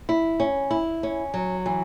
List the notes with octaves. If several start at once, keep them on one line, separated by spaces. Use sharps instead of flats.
E4
C#4
E4
C#4
F#3
E3